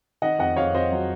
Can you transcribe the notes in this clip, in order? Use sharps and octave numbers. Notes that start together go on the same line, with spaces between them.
D#3 D#5 F#5
F2 D#5 F#5
F2 C#5 F5
F2 C5 D#5
F#3